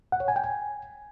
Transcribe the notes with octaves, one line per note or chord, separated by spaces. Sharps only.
F#5
C#5
G#5
G5
G#5